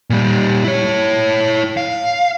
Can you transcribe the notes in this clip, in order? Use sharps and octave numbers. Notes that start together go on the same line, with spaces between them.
A#2 G3
E4 C#5
F5